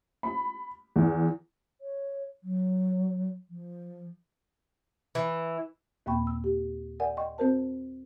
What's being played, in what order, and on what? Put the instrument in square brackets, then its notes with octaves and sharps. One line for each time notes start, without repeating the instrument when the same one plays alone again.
[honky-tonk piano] B5
E2
[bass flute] C#5
F#3
F3
[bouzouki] E3
[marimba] D#2 A#2 A#3 G5 B5 C#6
E6
G4
A#4 D5 F#5 G#5
D#5 G5 C6 C#6
C4 F#4 A#4 C5 A5